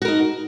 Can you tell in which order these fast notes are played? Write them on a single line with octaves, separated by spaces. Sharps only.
F#4 A#4 D#4